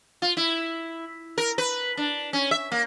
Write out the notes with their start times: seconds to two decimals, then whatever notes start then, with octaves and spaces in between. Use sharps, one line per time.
0.22 F4
0.37 E4
1.38 A#4
1.58 B4
1.97 D4
2.33 C#4
2.51 E5
2.72 A#3